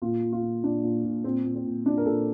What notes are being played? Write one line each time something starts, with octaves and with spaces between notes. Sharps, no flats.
A#2 F4
A#2
F4
A#2
A#2 D4
A#2
A#2
A#2 C4
A#2
C4
A#2
A#2 D4
A#4
A#2 A4